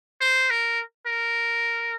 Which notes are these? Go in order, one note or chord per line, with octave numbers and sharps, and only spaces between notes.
C5
A#4
A#4